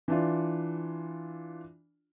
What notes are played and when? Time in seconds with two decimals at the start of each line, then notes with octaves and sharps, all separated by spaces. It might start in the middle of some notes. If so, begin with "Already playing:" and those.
0.08 E3 D4 F4